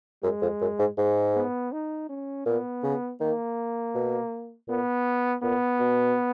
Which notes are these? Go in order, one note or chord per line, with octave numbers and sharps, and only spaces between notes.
F#2 G#3
F2
F#2
G#2
G#2 G#3
B3
D#4
C#4
A#2 B3
C#3
D#3 A#3
B2
A#2 B3
A#2 B3
B2